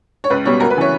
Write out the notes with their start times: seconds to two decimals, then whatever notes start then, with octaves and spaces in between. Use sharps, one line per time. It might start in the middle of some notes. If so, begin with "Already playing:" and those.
0.24 C#5
0.30 C#2 B4
0.45 B2 G3 B3 C#5
0.60 D2 A#4
0.70 B4
0.76 C#3 E3 C#5